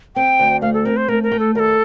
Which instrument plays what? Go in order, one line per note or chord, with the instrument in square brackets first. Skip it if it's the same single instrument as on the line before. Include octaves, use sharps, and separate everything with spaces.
[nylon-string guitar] C4 [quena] G5
[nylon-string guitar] D2
[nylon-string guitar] A3 [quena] F5
[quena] A4
[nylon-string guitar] C4 [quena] A#4
[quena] C5
[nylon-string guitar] A3 [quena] A#4
[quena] A#4
[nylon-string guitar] A3
[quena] A4
[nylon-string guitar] D#2 [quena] A#4
[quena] A4